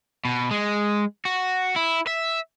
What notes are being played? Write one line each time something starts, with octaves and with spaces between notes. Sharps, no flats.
B2
G#3
F#4
E4
E5